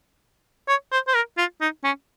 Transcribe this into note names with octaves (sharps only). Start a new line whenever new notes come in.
C#5
C5
C5
A#4
F4
D#4
C#4